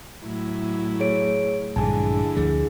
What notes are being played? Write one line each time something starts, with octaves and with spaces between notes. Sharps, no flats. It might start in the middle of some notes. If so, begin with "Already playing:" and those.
A2 F#3 E4
G#4 C#5 D7
A#1 G2 D3 G#3 E4 G#4 G#5 A5
D2 F3 A3 G#4